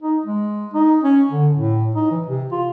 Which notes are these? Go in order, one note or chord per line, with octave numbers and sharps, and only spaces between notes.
D#4
G#3
D#4
C#4
D3
A2
D#4
E3
C3
F4